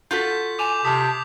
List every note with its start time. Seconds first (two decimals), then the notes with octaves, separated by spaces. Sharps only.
0.11 F4 F#4 A4 G6 B6
0.59 G#5 D6 F7
0.85 C3 A5 D#6 B6